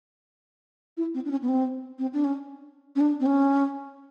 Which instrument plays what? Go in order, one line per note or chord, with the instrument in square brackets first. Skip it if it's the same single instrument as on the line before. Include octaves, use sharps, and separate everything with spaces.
[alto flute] E4
C4
D4
C#4
B3
C4
C4
D4
C#4
C#4
D4
C4
C#4